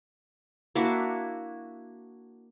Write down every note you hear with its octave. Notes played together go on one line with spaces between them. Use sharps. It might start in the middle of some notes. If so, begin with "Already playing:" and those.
A#3 D4 E4 F#4